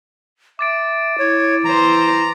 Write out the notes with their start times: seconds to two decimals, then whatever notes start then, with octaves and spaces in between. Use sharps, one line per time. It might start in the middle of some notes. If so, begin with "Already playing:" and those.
0.59 E5 D6 A6 D7
1.19 E4 C#5
1.65 E3 C5 A#5